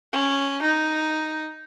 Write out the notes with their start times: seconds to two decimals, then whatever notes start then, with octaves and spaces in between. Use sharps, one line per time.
0.13 C#4
0.62 D#4